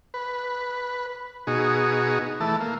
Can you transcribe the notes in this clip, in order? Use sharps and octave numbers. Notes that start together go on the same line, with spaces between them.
B4
B2 D#4 F#4 G#4
E3 A3 A5
A#3